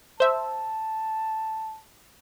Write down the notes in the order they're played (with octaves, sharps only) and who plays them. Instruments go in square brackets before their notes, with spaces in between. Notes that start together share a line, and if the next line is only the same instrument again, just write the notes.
[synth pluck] C5 E5 [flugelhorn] A5